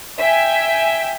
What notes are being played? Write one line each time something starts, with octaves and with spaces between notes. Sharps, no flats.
E5 G5 G#5